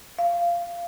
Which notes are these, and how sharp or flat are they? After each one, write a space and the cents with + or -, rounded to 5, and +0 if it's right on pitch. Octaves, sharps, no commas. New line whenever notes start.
F5 -15